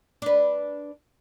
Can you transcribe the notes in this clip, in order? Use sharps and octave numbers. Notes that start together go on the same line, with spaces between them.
D4 B4